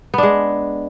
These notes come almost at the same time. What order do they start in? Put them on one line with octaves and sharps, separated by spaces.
B3 D4 G#3